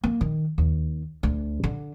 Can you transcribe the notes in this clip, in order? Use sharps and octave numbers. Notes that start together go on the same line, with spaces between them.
A#3
D#3
D#2
D2
D3